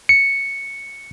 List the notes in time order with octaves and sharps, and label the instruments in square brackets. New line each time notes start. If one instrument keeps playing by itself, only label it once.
[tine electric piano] C#7